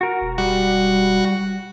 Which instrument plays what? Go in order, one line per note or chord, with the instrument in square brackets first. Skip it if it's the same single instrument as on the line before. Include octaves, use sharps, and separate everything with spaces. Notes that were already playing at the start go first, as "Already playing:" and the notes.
[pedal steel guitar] F#4 A#4
[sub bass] E1
[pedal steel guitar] G3 [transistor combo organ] F#4